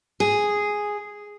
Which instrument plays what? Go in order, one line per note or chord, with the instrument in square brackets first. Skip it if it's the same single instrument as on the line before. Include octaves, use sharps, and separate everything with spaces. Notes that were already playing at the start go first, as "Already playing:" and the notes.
[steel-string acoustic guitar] G#4